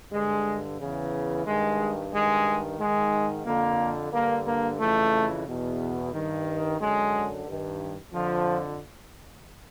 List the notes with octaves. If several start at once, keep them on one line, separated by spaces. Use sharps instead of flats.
G2 D3 G#3
E2 C#3 E3
G2 D#3 G#3
G2 D#3 G#3
G#2 D#3 G#3
F2 D3 A#3
G2 D3 A#3
A#3
F2 C#3 E3 A3
E2 B2
G2 D#3
F#2 D3 G#3
G2 D#3
F2 D3 F3